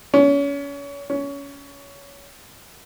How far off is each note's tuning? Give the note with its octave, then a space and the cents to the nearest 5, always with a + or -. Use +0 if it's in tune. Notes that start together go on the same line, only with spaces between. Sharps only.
C#4 +30
C#4 +20